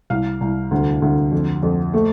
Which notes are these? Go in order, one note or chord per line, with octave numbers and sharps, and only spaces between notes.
C2 F5
C2
D2
D2
F2
F2
A3